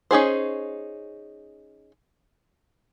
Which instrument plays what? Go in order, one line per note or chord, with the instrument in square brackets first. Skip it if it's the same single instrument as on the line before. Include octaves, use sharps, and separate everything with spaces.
[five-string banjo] C#4 D#4 G#4 C5